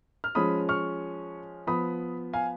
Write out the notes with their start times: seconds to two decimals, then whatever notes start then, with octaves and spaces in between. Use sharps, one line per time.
0.24 F6
0.35 F3 G#3 C#4 B5 D#6
0.69 C#6 F6
1.67 F3 B3 B5 D#6
2.33 F5 G#5